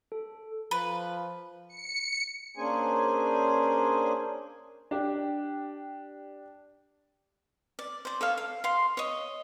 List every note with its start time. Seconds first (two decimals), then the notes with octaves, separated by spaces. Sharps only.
0.12 A4
0.71 F3 B4
1.68 C#7
2.57 A#3 C#4 D4 G#4 C5 G#5
4.91 D4 G4
7.79 D5
8.05 C5 D5
8.21 A4 C#5 F5
8.37 F5
8.64 F5 C6
8.97 C#5 D#5